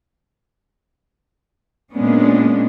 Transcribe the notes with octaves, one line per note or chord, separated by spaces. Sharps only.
A#2 G#3 A#3 B3 C#4 D4